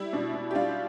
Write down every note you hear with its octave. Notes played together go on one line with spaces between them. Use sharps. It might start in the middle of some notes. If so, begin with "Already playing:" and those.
Already playing: G3 E4
B2 D4
B2
G4
G3 D4 F4